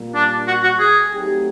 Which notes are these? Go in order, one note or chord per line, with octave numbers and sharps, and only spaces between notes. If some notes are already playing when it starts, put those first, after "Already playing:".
Already playing: A#2 G3 A#3
D4
F#4
F#4
G#4
F#3 A3 C4 D#4 G4